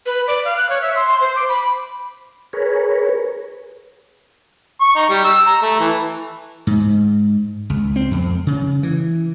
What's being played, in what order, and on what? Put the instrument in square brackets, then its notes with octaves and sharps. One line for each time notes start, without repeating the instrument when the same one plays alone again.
[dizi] B4
D5
F5
F#6
C#5
E5
C6
C6
C5
D6
B5
[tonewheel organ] G#4 A#4 B4 C#5
[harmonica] C#6
D#4
G3
E6
A#5
A3
E3
[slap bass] G#2
C#2
C4
F2
C#3
E3